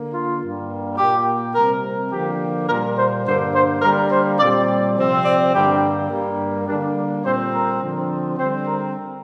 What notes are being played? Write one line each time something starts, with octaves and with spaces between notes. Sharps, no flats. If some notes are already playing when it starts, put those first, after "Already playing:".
Already playing: D3 A#3
F4
G2 G3 A#3
A#2 A#3 G4
C3 G3 C4 A#4
D3 F3 A#3 G4
A#2 G3 A#3 A#4
C5
G2 D3 A#3 C5
C5
D3 G3 A#3 A#4
C5
A#2 G3 C4 D5
C3 F3 C4
D5
G2 D3 G3 A#3 G4
G2 G3 A#3
D3 G3 A#3 D4
A#2 G3 C4 C5
A#4
D3 F3 C4
D3 G3 C4 C5
A#4